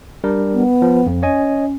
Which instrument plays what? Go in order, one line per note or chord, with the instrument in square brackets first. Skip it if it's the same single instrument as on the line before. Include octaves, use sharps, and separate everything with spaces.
[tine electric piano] G3 D4 A#4
[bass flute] B3
[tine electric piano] F3
F2
[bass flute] C#4 [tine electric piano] C#5 D#5 G#5